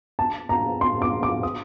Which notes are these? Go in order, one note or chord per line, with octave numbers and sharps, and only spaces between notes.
A5
A#5
C6
D6
D6
D#6